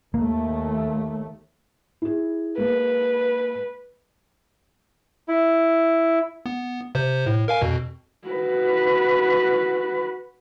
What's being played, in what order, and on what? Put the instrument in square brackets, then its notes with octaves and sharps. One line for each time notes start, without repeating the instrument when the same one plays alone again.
[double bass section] D#2 A3 [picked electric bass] A#3
[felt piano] E4 G#4
[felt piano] G#3 A#3 [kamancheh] B4
[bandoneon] E4
[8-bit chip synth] B3
C3 C5
A2
A#4 F5 G#5
F2 B2
[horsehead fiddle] F#4 B4